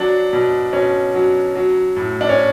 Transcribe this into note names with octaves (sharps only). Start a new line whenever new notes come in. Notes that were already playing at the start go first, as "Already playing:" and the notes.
Already playing: F#3 D4
B2
B2 C#4
F#3
F#3
A2
D4
C#4